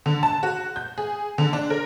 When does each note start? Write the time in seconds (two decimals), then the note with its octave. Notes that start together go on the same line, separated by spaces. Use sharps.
0.06 D3
0.23 A5
0.43 F#4
0.76 G6
0.98 G#4
1.38 D3
1.53 D4
1.70 A#4